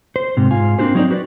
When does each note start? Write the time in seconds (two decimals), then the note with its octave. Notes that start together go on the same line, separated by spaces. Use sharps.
0.16 C5
0.37 G#2 C3
0.51 G#2 F4 G#5
0.79 A#3 C4 D4 F#4 G4 C5
0.95 F#3 C4 D#4 F4 C5 D5
1.11 F#4 B4 C5 D5